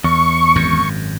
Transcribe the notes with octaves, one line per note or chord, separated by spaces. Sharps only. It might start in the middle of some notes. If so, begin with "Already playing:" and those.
E2 C#6
G#1 F#2